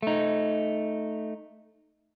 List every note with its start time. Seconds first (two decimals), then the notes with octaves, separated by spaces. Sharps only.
0.02 A3 D#4